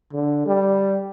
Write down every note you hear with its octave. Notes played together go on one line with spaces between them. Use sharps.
D3
G3